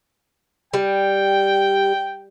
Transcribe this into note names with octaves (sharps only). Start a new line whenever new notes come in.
G3 G5